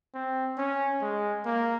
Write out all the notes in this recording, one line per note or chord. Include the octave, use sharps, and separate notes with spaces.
C4
C#4
G#3
A#3